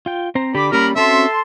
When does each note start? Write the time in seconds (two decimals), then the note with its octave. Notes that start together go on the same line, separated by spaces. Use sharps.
0.06 F4 G5
0.35 C4 C5 A#5
0.55 D3 G4 D5 B5 D6
0.72 G3 A#3 C#4 G4 A#4 B5
0.96 C4 C#4 F#4 A4 E5 A5 C6